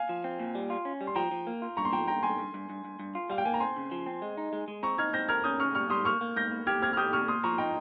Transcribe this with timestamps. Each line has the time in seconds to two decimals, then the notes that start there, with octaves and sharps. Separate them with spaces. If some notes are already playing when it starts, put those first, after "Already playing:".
Already playing: F5 G#5
0.09 F3
0.24 C4
0.39 A#2
0.55 G3
0.70 F4
0.85 C#4
1.01 G3
1.07 C6
1.16 F3 G5 A#5
1.31 F3
1.47 A#3
1.62 F4
1.77 G2 A#5 C#6
1.85 C6
1.92 F3 G5 A#5
2.07 G2 G5 A#5
2.22 G2 G#5 C6
2.39 G2
2.54 G2
2.70 G2
2.85 G2
2.99 G2
3.15 F4
3.30 G3 F5
3.38 G5
3.45 A#3 G#5
3.54 A#5
3.60 C4 G#5 C6
3.77 C#3
3.91 F3
4.06 C4
4.22 G#3
4.38 D#4
4.53 G#3
4.68 G#3
4.83 C4 A#5 C#6
4.98 D#4 F6 G#6
5.13 C4 G6 A#6
5.29 A#4 F6 G#6
5.44 C#4 D#6 G6
5.60 C#3 C#6 F6
5.75 G3 C#6 F6
5.90 G3 C6 D#6
6.05 A#3 C#6 F6
6.21 A#3
6.36 G#2 G6 A#6
6.51 A#3
6.67 G4 F6 G#6
6.82 C4 F6 G#6
6.93 F6
6.97 G4 D#6 G6
7.13 C3 C#6 F6
7.28 A#2 C6 D#6
7.44 F3 A#5 C#6
7.58 D#4 G5 A#5